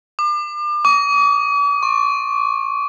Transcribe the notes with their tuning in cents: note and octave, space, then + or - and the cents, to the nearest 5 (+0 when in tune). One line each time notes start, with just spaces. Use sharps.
D6 +35
D6 -45
C#6 -35